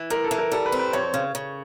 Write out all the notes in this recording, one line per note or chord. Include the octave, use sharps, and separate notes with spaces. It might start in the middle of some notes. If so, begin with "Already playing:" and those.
Already playing: E3
A2 A#4
A4
E3
A#4
G3 A4
B4
C4
B4
F2 C#5
C#3
C#3